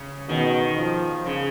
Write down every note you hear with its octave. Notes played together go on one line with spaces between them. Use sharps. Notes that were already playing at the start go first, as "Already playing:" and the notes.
Already playing: C#3
B2 D#3
F3
C#3